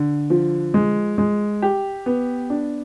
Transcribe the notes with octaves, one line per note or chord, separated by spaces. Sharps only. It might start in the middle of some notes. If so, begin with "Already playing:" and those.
Already playing: D3
F3
G#3
G#3
G4
B3
D4